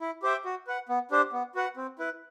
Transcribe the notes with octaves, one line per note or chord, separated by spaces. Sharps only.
E4
G4 C5 E5 G5
F#4
B4 F#5
B3
D4 G4 C5
B3
F#4 B4 F#5
C4
E4 B4